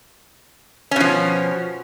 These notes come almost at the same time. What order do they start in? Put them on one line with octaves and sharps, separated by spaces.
C#4 B2 F3